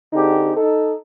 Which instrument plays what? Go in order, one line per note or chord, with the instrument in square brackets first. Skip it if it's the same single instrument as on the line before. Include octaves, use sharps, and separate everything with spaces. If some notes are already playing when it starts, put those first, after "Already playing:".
[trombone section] D3 C4 D#4 G4 G#4
D#4 A4